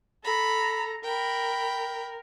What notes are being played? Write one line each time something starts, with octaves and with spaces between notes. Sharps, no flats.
A4 A#5 B5
A#4 G5 B5